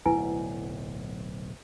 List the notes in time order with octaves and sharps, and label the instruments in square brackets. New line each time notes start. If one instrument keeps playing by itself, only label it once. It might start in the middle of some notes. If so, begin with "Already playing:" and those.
[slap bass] D1 B1 [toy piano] E4 B4 G#5